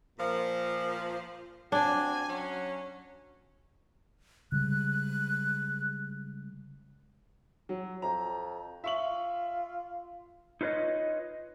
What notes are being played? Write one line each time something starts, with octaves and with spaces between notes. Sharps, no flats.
A#2 F3
C4 D4 F#4 G#5
F#3 C#4
C#3 G3 G#3 F#6
F#3
F2 A#5
F4 E5 C#6 F#7
D#4 F4 B4 C#5 D#5